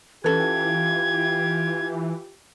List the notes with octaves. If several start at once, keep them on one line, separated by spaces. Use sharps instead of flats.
E3 C#4 F4 G4 A4 B4 G#6